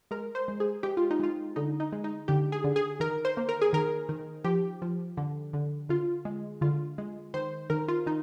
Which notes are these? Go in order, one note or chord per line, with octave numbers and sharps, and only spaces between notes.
G#3 A#4
C5
G#3
G#4
G#3 G4
F4
D#4
G#3 F4
D3 D#4
D#4
G#3
D#4
D3 G4
G#4
D3
G#4
D#3 A#4
C5
A#3
A#4
G#4
D#3 A#4
D#3
F3 G4
F3
D3
D3
D3 F4
G#3
D3 F4
G#3
D#3 C5
D#3 A#4
F4
D#3 D#4